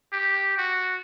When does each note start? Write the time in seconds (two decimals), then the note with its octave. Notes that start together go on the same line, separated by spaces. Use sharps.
0.13 G4
0.58 F#4